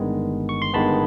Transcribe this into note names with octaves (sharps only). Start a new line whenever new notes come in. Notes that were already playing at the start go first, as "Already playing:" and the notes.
Already playing: G1 G2 D#3 G#3 B3
C#6
C6
G1 G2 D#3 G#3 B3 A5 B5